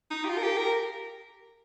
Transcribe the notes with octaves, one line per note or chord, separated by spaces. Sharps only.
D#4
G4
F4
A#4
G4
A#4